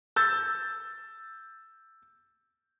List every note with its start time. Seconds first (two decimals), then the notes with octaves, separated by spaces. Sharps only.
0.16 E6 G6 A6